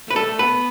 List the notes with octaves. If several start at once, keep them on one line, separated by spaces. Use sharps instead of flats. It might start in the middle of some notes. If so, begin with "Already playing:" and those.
A3 B4
G3 A4
A3
B3 B4